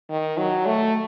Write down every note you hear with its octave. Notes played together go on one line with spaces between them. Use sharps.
D#3
F#3
A3